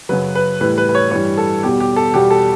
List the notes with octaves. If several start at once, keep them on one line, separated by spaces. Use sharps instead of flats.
F#2 C#3 F#3 B4
B4
A2 E3 G3 B4
B4
B4
C#5
G2 E3 G3 C#5
A4
E2 B2 G3 G4
G4
A4
E2 B2 G3 G4
A4